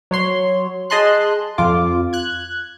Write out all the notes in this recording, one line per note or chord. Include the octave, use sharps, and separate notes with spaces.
F#3 C#5 C6
G#4 D#5 A5 C6 F#6
F2 F4 D6
F#6 G#6